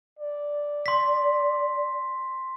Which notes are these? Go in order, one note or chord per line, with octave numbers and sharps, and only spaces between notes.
D5
C6 B6